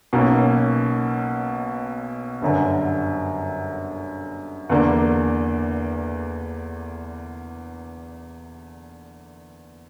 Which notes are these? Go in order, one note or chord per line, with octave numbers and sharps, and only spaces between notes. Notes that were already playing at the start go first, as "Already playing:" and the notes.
B1 B2 A#3 C#4
G1 F#2 D3
E2 D3 A#3 D4